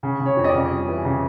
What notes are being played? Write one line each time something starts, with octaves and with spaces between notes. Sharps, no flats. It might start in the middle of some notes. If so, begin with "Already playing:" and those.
C#3
C#3
C#5
F2
D#5
D5
C#3
G3
E3
C#3